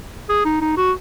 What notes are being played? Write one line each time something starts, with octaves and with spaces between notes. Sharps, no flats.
G#4
D#4
D#4
F#4